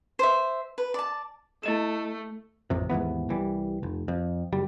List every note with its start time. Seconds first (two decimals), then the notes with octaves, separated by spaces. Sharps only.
0.19 C5 E5
0.78 B4
0.94 D5 A5
1.63 A3 E4 D#5 E7
2.70 A1 F2 C3
2.90 D#2 G#2 E3 B3
3.29 C2 E3 G3
3.83 F1
4.08 F2
4.52 F#1 G3